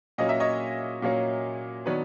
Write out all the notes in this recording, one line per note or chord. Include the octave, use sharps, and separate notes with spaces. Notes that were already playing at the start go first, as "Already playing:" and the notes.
A#2 F#3 A#3 C#4 D#5
E5
C#5 D#5
A#2 F#3 A#3 C#4
D#3 F#3 B3 D4 B4 C#5